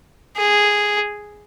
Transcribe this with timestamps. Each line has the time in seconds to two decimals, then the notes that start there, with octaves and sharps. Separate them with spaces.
0.37 G#4